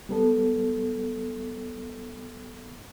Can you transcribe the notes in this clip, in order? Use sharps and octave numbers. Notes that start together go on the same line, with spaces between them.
G3 B3 A4